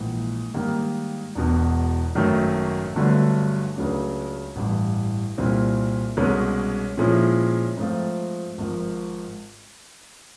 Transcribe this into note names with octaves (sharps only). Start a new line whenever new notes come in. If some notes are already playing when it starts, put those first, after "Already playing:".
Already playing: A#1 G#2 E3
G#2 D#3 G3 A#3
E1 E2 B2
G#1 F#2 D#3 F#3 A3
G1 G2 D3 F#3 A3
C#2 C#3 F#3 A3 D4
A1 G2 E3
C2 A#2 G3 C4 E4
C2 B2 G#3 C#4
A#2 F3 G#3 C#4 E4
G#2 F3 A3 C4 F4
G#1 G#2 F3